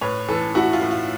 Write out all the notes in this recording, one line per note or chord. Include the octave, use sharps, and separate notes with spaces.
A2 B4 C#5
E3 A4 B4
A3 E4 F#4
F4
A2
F4